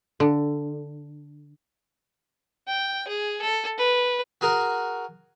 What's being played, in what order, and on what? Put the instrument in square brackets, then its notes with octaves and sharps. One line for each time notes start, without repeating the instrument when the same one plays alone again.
[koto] D3
[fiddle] G5
G#4
A4
B4
[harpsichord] F#4 G#4 A#4 F#5